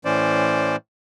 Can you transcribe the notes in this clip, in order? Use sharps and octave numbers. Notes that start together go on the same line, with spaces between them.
A2 E3 C#4 C5 D5